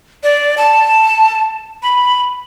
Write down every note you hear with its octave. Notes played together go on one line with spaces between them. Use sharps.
D5
A5
B5